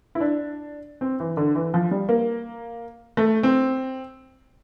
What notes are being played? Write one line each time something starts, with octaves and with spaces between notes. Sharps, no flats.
E4
D4
C4
E3
D3
E3
F3
G3
A#3
A3
C4